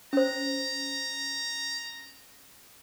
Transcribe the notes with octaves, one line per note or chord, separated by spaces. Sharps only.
C#4 C5 A#5